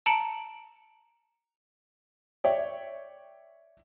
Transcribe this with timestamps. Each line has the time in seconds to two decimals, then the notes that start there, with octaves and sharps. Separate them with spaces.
0.06 A5 A#5 C#7 D7 E7 F#7
2.44 C#5 D5 E5 G5